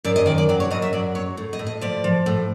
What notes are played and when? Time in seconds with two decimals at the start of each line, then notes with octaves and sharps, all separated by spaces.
0.04 F#2 D5
0.16 D#5
0.26 D#3 D5
0.38 D5
0.49 F#3 D5
0.60 C#5
0.71 F#2 D#5
0.82 E5
0.93 F#3 D5
1.15 F#3 C#5
1.37 A2
1.53 D#5
1.59 A2
1.67 D#5
1.81 F3 D5
2.04 F3
2.26 A2